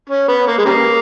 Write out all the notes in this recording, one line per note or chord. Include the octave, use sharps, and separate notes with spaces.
C#4
B3
A#3
G#3
C#3 G3 A#3